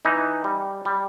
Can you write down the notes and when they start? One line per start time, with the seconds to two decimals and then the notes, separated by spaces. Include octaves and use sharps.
0.05 E3 D#4
0.44 G3
0.85 G3